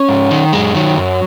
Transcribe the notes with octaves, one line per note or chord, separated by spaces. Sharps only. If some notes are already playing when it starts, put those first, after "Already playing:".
Already playing: C#4
G#2
D#3
F#2 G#3
D#3 F#3
F#2